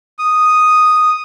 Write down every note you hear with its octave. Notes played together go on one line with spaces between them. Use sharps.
D#6